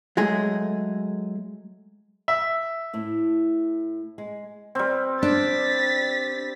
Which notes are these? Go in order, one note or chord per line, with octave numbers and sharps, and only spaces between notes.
F#3 G#3 A3 G#4
E5
A2 A3
G#3
G3 C4
D4 A6 B6